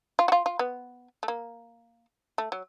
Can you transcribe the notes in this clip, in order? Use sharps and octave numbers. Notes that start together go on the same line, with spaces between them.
F4
F#4
F4
F4
B3
A3
A#3
A3
F#3